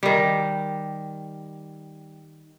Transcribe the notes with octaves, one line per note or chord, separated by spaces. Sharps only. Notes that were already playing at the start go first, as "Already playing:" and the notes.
D#3 G3